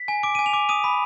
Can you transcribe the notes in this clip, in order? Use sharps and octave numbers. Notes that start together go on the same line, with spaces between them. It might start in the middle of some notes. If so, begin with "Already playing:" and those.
Already playing: B6
G#5
D6 D7
G#5 D#7
F7
D6
D#6 D#7
B5